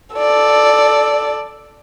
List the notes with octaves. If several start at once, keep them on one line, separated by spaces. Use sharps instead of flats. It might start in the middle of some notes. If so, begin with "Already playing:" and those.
A4 D5